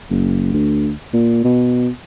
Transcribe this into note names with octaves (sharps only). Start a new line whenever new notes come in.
F#1
D2
A#2
B2